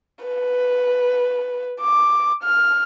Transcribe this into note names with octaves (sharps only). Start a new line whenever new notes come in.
B4
D6
F6